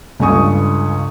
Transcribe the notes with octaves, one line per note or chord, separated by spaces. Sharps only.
C#2 G2 A4 G#5 C#6 D#6